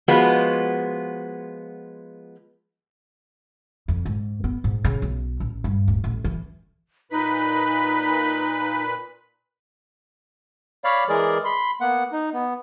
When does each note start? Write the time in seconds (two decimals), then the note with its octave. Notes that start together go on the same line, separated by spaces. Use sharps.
0.08 F3 G#3 B3 F4 F#4
3.88 F2
4.06 G#2
4.44 B3
4.64 G#2
4.84 C#3
5.02 B1
5.40 A1
5.64 G2
5.88 D1
6.04 A1
6.24 E3
7.11 A#2 D#4 B4 B5
10.84 C#5 D5 F5 B5
11.09 E3 G#3 G#4 A#4 D5
11.45 B5 C6
11.81 A#3 B3 F#5
12.12 D#4
12.33 B3